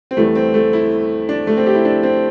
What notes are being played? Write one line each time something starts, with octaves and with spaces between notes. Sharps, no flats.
C4
E2 E3 G3 A3
C4
A3
E4
D4
A3
C4
G4
E4
D4
C4